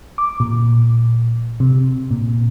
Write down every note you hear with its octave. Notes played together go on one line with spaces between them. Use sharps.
D6
A#2
C3
A#2